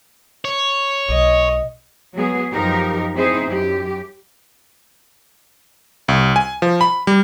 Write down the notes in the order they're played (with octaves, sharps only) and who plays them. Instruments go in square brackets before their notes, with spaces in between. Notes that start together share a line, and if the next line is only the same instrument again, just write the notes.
[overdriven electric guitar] C#5
[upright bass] B1 [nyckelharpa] D#5
[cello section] F#3 G#3 B3 G#4
F#2 F3 D#4 G4 A#4
C4 D#4 E4 G#4 C5
F#2 G4
[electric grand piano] C2
G#5
F3
B5
G3